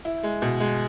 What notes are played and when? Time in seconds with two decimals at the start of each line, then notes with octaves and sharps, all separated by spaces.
0.05 E4
0.23 G#3
0.42 B2
0.60 G#3